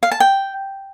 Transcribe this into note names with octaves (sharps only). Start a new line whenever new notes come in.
F5
A5
G5